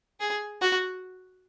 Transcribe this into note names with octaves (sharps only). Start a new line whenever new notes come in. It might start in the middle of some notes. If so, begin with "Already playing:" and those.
G#4
F#4